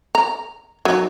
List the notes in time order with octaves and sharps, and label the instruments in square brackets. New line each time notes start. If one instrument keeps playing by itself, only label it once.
[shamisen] A#5
F#3 D#4